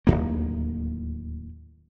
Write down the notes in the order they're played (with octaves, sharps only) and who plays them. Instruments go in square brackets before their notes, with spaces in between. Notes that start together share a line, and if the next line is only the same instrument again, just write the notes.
[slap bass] D1 G1 D#2 A#3